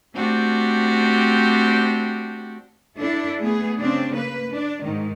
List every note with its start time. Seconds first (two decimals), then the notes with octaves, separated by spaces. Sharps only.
0.15 A3 C4 D4 F#4 G4
2.97 D4 E4 A4
3.42 A3 B3 G#4
3.82 C#3 C4 D4
4.17 A#3 B4
4.53 D4
4.84 G#2 D#3